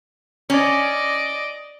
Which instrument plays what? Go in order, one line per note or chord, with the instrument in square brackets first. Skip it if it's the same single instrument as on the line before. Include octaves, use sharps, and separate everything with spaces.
[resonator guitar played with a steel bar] C#4 [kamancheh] D5 D#5